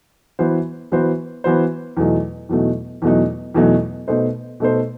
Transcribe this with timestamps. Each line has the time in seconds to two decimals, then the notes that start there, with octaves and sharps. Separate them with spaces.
0.39 E3 B3 F#4 C5
0.92 E3 B3 F#4 C5
1.44 E3 B3 F#4 C5
1.97 E2 B2 F#3 A3 D#4
2.49 E2 B2 F#3 A3 D#4
3.02 E2 B2 F#3 A3 D#4
3.55 E2 B2 F#3 A3 D#4
4.08 B2 A3 D#4 A4 C5
4.60 B2 A3 D#4 A4 C5